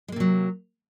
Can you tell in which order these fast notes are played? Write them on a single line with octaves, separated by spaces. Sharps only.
G#3 A#3 C3 F#3